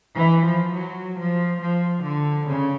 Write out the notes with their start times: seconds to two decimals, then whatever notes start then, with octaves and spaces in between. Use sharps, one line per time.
0.15 E3
0.44 F3
0.73 F#3
1.16 F3
1.59 F3
2.02 D3
2.46 C#3